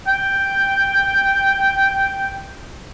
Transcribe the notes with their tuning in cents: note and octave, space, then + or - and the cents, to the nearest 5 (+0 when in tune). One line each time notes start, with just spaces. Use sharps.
G5 +0